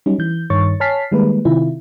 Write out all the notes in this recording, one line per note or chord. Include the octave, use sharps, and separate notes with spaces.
F#3 G3 C#4 D#4
E3 G6
G2 D#3 C#5 C#6 A6
C#5 G#5 A5 F6 B6 C7
D#3 G3 G#3 A#3 B4
C3 D#3 E4 F4